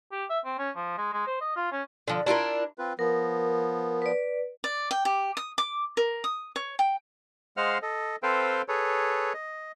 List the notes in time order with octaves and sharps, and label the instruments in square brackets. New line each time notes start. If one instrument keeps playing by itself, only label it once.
[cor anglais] G4
E5
C4
C#4
F3
G#3
G#3
C5
D#5
F4
C#4
[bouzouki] D3 F3
D4 E4 F4 A#4
[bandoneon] C4 F4 B4
[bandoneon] F3 B3 [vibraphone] A#4
[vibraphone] B4 D5
[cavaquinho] D5
G5
G4
D#6
D6
A#4
D#6
C#5
G5
[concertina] G#3 C5 D#5 F5 F#5 F6
A4 D#5
C4 A4 B4 C5 F5 G5
G#4 A4 B4 C#5
D#5